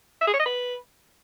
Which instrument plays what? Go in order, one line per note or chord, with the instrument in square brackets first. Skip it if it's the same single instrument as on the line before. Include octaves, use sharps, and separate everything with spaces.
[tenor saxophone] E5
G#4
C#5
D#5
B4